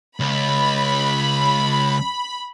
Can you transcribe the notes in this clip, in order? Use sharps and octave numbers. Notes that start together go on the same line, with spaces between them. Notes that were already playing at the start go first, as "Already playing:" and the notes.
C#2 B5